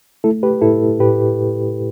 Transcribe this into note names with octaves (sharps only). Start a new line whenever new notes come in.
A3 E4 A4
G4 B4
A2 E4 A4
A2 G4 B4